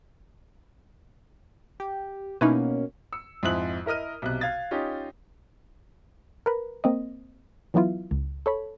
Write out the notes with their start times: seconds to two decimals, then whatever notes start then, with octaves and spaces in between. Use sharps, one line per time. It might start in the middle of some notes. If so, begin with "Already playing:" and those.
1.80 G4
2.41 B2 A#3 C#4 D#4 E4 B4
3.13 E6 C#7
3.43 F2 G#2 E4 D#6 F#6 F#7
3.86 E4 A#4 D#5 F6 D#7
4.22 B1 C3 F#6
4.41 F5 G#6 A6
4.71 C#4 D#4 F4 G4
6.46 A#4 B4
6.84 A#3 C4 D#5
7.74 E3 F#3 B3 E4 F4
8.11 C#2
8.46 A4 C#5 B5